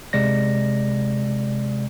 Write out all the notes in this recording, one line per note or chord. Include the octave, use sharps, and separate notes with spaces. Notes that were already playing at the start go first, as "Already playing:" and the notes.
C3 G#3 D5 A#6